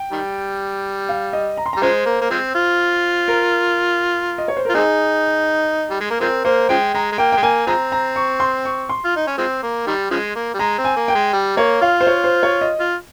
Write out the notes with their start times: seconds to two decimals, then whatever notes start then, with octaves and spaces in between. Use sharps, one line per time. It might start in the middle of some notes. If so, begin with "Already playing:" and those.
Already playing: G5
0.12 D#3 G3
1.09 F5
1.33 D#5
1.57 A#5
1.66 C6
1.73 G3 A#5
1.82 C#3 F3 G#3 C5
2.06 A#3
2.22 A#3
2.31 F3 G#3 C4
2.55 F4
3.28 A#4
4.38 D#5
4.48 C#5
4.57 C5
4.65 A#4
4.69 F4
4.74 G#3 C4 D#4 G#4
5.90 G3
6.00 G#3
6.10 A#3
6.21 F3 G#3 C4 A#4
6.45 A#3 C5
6.69 C#3 F3 G#3 G5
6.94 G#3 A#5
7.12 G#3
7.18 A#3 G5
7.32 G#3 G5
7.43 A#3 G#5
7.67 F3 G#3 C4 A#5
7.92 A#5
8.16 C#6
8.40 C6
8.65 C#6
8.89 C6
9.04 F4
9.16 D#4
9.27 C#4
9.38 F3 G#3 C4
9.63 A#3
9.87 D#3 G3
10.11 C#3 F3 G#3
10.35 A#3
10.54 G3
10.59 G#3 A#5
10.78 C4
10.85 G#5
10.96 A#3
11.08 G5
11.15 G#3
11.33 G3
11.57 A#3 C#5
11.81 F4 F5
12.01 C5
12.07 C#5
12.24 C5
12.43 C#5
12.61 D#5
12.80 F4